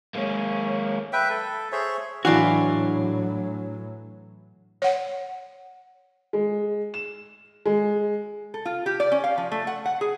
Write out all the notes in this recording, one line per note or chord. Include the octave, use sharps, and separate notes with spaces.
G#3 A#3 C#4
B4 E5 G5
A4
G#4 C5 C#5 E5
A2 E3 F#3 D4 F#4 F5 C6
C#5 F#5
G#3
E7
G#3
A4
F4
G4
D5
C#4
F5
F3
A3
F#5
F#5
G#4